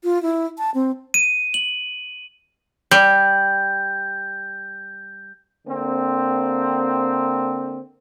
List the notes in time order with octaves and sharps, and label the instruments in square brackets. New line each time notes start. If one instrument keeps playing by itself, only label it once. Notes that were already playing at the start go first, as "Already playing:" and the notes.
[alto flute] F4
E4
A5
C4
[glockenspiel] D#7
F#7
[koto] G3 [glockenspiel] G6
[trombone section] D3 A#3 C4